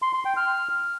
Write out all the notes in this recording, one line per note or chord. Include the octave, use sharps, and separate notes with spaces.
C6
C6
G5
F6